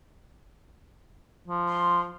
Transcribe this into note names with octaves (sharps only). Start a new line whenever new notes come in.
F3
C6